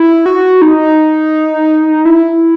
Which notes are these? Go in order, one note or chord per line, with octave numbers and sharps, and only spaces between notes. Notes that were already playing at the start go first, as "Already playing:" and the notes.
Already playing: E4
F#4
D#4
E4